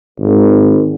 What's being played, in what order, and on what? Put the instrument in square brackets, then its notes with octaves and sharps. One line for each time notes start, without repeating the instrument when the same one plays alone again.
[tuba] G#1